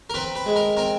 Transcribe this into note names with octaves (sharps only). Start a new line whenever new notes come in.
A#4
C4 B4
B4
G#3
A#4
C4 A#4